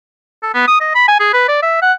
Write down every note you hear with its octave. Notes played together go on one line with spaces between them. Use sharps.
A4
B3
D#6
D#5
B5
G#5
G#4
B4
D5
E5
F#5